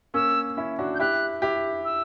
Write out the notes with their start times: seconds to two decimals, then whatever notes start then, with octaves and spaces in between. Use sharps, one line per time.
0.14 A#3 C#4 E6
0.57 C#4 E4
0.79 D4 F#4
0.95 G6
1.00 E4 G4 F#6
1.42 E4 G4
1.85 E6